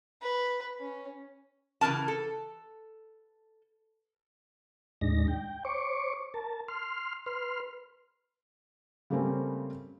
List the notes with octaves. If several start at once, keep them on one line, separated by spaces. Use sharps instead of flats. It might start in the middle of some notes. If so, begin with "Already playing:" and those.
B4
C#4
C#3 E3 F#4 A#4 A5
A4
D#2 A2 G#3 D4 D#4 A#6
G5
C5 C#5 C#6 D6
A#4 A5
C6 F6
B4 C6 F6
C#3 G3 A3 A#3 C4 C#4